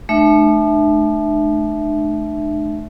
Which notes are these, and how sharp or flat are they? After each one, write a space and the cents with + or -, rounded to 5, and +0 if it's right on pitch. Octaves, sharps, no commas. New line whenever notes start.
A3 -30 D4 +45 E5 +0